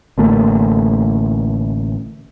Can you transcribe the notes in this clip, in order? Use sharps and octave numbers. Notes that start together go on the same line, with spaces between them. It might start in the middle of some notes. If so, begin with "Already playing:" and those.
A1 D3 A3 A#3